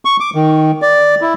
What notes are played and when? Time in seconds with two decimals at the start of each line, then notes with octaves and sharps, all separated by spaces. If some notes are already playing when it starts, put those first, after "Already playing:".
0.05 C#6
0.20 D6
0.35 D#3
0.82 D5
1.21 E4